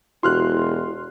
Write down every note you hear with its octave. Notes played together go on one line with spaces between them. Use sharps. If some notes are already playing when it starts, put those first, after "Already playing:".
E1 E4 F#4 G4 C6 F6 F#6